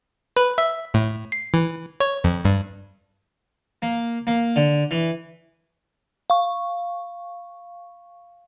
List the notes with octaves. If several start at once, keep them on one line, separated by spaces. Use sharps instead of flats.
B4
E5
A2
C7
E3
C#5
F2
G2
A#3
A#3
D3
E3
F5 C#6